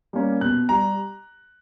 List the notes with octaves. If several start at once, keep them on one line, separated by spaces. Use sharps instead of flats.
G3 A#3 C#4
B2 F#6
G3 A#5